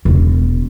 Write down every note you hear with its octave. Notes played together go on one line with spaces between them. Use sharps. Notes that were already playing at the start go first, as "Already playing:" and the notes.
E1